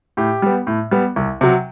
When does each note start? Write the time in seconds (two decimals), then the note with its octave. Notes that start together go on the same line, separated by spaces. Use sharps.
0.17 A2 G4
0.42 G3 B3
0.67 A2
0.91 G3 B3
1.16 C2
1.41 C3 F#3